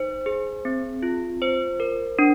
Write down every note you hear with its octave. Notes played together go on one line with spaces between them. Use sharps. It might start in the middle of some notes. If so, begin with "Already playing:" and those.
Already playing: D#4 C5
G#4
C4
F4
C5
A#4
D4